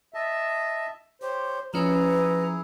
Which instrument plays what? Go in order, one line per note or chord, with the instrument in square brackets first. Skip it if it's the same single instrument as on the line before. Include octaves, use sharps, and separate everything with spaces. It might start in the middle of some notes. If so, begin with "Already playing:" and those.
[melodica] D#5 A5 [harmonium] E5
[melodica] G4 [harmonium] C5 [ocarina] C#5
[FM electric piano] F3 C#4 [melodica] E4 G#4 [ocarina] B4 [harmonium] A#5